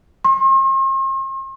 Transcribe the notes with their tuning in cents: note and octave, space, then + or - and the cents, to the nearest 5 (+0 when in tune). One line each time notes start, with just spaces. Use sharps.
C6 +45